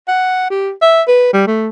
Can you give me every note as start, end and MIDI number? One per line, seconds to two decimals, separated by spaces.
0.08 0.46 78
0.50 0.71 67
0.82 1.02 76
1.08 1.30 71
1.33 1.44 55
1.47 1.69 57